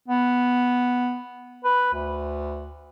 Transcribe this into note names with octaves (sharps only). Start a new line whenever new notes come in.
B3
B4
D2